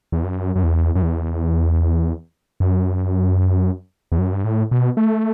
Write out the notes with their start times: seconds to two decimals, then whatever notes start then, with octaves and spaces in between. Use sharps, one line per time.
0.12 E2
0.24 F#2
0.56 F#2
0.63 E2
0.95 F#2
1.02 E2
2.60 F#2
4.12 E2
4.19 F#2
4.33 G2
4.45 A2
4.71 B2
4.97 A3